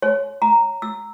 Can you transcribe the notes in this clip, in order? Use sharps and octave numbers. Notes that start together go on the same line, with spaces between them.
C#5
A#5
E6